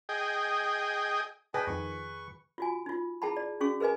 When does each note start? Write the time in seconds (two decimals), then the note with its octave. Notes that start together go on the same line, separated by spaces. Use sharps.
0.09 G#4 D#5 G5
1.54 D4 G#4 B4 D#5 G5
1.67 F2 D#3 C#6
2.58 F4 F#4 G#5
2.86 D#4 F4
3.22 E4 G#4 G5 A5 B5
3.37 D5
3.60 C#4 F#4 G#4 C#6
3.80 G#4 A#4 B4 D#5 G#5